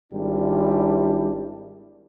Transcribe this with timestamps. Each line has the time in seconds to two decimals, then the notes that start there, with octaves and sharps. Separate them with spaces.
0.13 G#1 G3 D4 E4